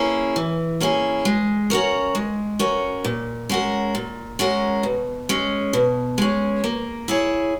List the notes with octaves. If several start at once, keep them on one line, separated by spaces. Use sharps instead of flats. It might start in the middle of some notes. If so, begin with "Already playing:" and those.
Already playing: A#3 C#4 E4 G#4
E3
A#3 C#4 E4 G#4
G#3
C#4 F#4 A#4 C#5
G#3
C#4 F#4 A#4 C#5
A#2
G#3 C#4 F#4 A#4
A#2
G#3 C#4 F#4 A#4
B2
G#3 C#4
B2
G#3 C#4
A#3
E4 G#4 C#5